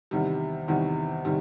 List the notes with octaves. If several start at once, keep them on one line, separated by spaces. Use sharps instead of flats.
E2 C3 D#3 G3
E2 C3 D#3 G3
C3 D#3 G3